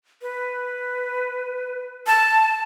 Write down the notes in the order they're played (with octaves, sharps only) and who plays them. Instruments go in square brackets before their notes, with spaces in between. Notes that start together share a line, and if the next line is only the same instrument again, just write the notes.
[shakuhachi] B4
A5